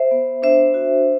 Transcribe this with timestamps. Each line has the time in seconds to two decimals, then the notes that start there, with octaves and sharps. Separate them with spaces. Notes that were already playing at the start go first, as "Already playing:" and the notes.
Already playing: C5 E5
0.11 B3
0.42 D4 C5 E5
0.74 F#4